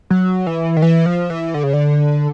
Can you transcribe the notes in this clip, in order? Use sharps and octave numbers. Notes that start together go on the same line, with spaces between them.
F#3
E3
D#3
E3
F3
E3
D3
C#3
D3